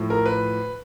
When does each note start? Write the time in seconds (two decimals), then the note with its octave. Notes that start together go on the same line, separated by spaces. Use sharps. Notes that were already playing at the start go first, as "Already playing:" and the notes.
Already playing: A2 F3
0.10 A#4
0.26 B4